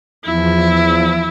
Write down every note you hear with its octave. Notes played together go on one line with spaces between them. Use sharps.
E2 F3 E4